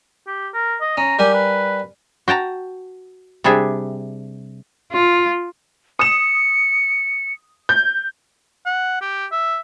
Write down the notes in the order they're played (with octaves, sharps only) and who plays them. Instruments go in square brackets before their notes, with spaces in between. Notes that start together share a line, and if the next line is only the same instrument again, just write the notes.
[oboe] G4
A#4
D#5
[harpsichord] C#4 [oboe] A#5
[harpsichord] G3 A#4 G#5 [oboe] G4
[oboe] B4
[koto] F#4 G5 A5 A#5
C3 G3 D4 G#4 E5
[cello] F4
[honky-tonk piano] D#6 E7 [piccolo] C#7
[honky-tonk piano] G6
[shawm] F#5
G4
E5